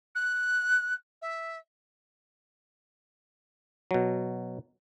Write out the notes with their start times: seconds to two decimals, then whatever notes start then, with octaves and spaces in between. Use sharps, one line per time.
0.15 F#6
1.22 E5
3.91 B2 F#3